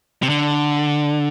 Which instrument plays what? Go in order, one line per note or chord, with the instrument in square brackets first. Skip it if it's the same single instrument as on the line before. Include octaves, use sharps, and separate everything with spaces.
[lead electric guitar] C3
D3